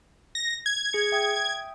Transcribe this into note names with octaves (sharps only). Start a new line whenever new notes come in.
A#6
G#6
G#4 C#7
E5 G5 D#6